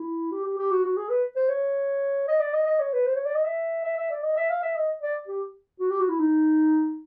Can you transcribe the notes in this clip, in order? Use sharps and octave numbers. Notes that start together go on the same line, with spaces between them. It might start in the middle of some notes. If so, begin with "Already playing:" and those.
Already playing: E4
G4
G4
G4
F#4
F#4
G#4
B4
C5
C#5
D#5
D5
D#5
D#5
C#5
B4
C5
C#5
D5
D#5
E5
E5
E5
D5
D#5
E5
F5
E5
D#5
D5
G4
F#4
G4
F#4
E4
D#4